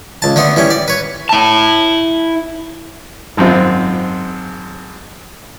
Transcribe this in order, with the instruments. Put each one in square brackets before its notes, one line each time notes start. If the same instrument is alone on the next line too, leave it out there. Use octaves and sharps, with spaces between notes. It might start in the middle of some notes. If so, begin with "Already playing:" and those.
[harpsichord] C#2 A5
D3 A3 B3 C6
E3 G3 C#4
D5
B4 C#5
[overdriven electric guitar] E4 A5
[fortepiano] G#1 F#2 C4 F4